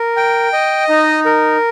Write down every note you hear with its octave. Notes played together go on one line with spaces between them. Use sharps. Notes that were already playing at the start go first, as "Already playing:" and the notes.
Already playing: A#4
G5
D#5
D#4
A#4